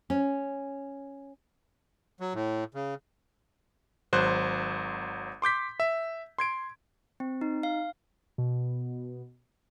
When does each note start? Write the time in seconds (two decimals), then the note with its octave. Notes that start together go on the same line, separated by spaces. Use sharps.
0.10 C#4
2.20 F#3
2.34 A2
2.74 C#3
4.13 G#1 F#3 C5 F#6
5.42 C6 D6 G6 B6
5.80 E5
6.39 C6 G#6 D7
7.20 C4
7.41 D#4
7.63 F5
8.38 B2